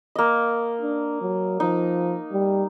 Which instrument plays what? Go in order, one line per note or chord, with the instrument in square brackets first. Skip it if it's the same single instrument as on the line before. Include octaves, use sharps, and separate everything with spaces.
[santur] A#3 D#5
[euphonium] D4
F#3
[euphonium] F3 [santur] D#4
[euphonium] G3